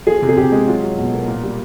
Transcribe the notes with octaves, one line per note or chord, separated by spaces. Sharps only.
F3 G#4
C3
G#4
C3 G4
G#3
F#3 F4
F#3
B2
A#3
A#2
G3